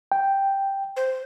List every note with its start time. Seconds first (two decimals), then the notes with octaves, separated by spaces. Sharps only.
0.12 G5
0.96 C5